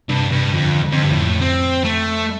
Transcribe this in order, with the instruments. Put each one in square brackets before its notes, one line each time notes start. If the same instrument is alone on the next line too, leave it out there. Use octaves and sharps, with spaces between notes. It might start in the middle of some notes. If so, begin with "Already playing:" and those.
[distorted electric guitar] G2 [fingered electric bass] C3
[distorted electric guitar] G2 [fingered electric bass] C3
[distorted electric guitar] F2 [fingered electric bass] D3
[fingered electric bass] D3
[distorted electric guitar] F2
G2
[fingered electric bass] F2 [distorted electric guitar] A2
[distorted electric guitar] C4
A3